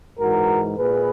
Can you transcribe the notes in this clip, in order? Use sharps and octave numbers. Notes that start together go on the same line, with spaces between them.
G#2 E3 F#4 A#4
A#2 G#4 B4